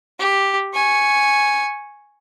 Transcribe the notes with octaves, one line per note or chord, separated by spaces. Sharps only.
G4
G#5 C#6